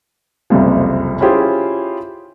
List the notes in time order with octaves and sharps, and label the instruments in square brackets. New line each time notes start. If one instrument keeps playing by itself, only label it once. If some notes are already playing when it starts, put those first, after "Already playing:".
[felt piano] F#1 C2 F2 F3
C#4 E4 F4 G4 G#4 C5